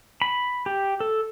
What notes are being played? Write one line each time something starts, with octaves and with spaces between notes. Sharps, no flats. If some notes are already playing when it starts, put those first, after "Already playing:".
B5
G4
A4